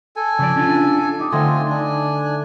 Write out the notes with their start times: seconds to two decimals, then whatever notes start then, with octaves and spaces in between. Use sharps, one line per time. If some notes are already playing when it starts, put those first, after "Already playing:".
0.16 A4 G#5
0.39 C#3 F3 D5
0.56 C#4 D4 F4
1.20 D#4 G4
1.32 D3 A3 C4 F4 D#5 G#5
1.70 D4 G#5